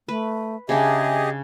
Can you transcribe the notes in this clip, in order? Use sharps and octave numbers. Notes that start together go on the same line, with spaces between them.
A3 B4
C#3 C#4 D4 G4 G#4 D#5 E5